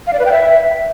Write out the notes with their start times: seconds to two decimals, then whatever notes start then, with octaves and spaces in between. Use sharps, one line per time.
0.07 F5
0.13 D5
0.19 B4
0.25 G5
0.32 E5